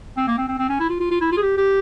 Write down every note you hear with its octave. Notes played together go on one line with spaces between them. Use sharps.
C4
A#3
C4
C4
C4
C#4
E4
F4
F4
F4
E4
F4
G#4
G4
G4